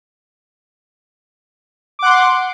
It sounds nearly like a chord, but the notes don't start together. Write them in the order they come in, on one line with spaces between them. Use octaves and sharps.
D6 F#5 C6